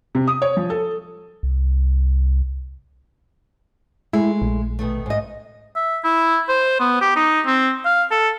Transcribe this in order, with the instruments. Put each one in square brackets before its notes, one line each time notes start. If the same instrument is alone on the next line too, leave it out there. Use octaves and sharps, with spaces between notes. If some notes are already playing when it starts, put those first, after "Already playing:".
[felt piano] C3
D#6
C#5
F3
A4
[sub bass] C2
[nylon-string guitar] G#3 A3 [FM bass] E4
[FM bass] A#1
[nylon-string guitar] B2 D#3 A3
G#2 D#5
[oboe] E5
E4
C5
B3
G4
D#4
C4
F5
A4